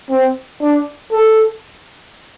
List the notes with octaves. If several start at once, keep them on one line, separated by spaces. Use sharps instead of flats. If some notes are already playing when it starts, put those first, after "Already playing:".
C4
D4
A4